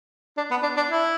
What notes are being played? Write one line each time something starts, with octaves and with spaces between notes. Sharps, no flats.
D4
B3
D4
D4
E4